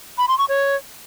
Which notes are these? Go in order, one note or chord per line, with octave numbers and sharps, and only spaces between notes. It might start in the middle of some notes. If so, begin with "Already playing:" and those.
B5
C6
C#6
C#5